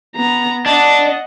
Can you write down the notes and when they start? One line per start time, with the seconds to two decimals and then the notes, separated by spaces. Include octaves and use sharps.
0.16 B3 A#5
0.66 D4 D#5 F#5